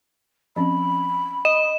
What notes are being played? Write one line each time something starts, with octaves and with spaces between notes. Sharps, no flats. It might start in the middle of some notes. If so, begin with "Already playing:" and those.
F3 C4 C#4 B5
D#5 E7